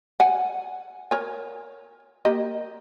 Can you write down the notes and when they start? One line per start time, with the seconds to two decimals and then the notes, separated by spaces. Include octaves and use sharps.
0.20 F#5 G#5
1.11 A#4 C#5 G#5
2.25 A#3 G4 D#5